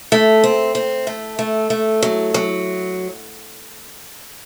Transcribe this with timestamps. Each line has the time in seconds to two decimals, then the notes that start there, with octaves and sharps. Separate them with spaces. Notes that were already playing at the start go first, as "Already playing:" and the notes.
0.12 A3
0.44 C4
0.75 C4
1.07 A3
1.39 A3
1.70 A3
2.02 F#3
2.34 F#3